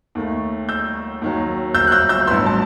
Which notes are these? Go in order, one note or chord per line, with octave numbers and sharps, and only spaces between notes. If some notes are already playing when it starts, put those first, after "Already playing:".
D#2 D#3 A3
E6 G6
D#2 D#3 F#3
E6 G6
F#6
E6 G6
E6 G6
A1 G2 F#3 B3 C6 E6
A5